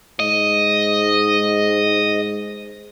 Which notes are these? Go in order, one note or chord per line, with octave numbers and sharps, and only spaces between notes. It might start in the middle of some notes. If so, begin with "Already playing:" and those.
G#2 D#5